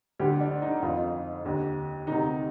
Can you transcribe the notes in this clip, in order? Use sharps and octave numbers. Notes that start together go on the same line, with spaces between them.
D2 D3 G4
D4
D#4
F2 D#3 F4
D#2 D3
D2 C3 D#3 D#4